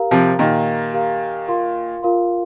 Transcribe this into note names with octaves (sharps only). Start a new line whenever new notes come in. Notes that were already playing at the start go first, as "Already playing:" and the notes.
Already playing: G4 A#4 F5 A#5
C3 F3
A#2 D#3 G4 A#4 F5 A#5
G4 A#4 F5 A#5
F4 A#4 F5 C6
F4 A#4 F5 C6